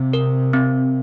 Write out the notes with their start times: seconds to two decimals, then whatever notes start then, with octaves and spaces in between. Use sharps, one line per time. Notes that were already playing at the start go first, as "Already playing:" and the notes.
Already playing: C3 C4
0.13 A#4
0.53 C4